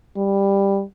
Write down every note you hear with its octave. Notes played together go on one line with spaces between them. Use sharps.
G3